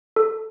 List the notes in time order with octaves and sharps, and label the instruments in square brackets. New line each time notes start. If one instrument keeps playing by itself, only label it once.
[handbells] A4